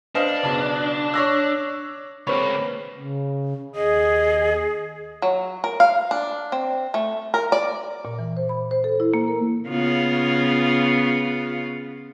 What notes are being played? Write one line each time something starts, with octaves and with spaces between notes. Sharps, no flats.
D4 B4 C5 D#5 F5
B1 C#3 A5 D6
C#5 D6 E6 F#6 A#6
C#2 A#3 C4 B4 C#5 B5
C#3
D#2 G#4 D#5
F#3
A#4
F5
D4
C4
A3
A#4
D5
A#2
E3
C5
B5
C5
A4
E4
A#3
A#4
C#3 B3 F4